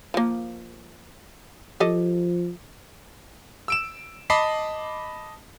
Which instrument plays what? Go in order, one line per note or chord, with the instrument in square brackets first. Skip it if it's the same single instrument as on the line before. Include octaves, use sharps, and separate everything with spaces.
[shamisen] F3 A#3
[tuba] F3 [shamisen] G4 A4 D#5
[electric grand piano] E6 D7 E7
D#5 A5 B5 D6 B6 C7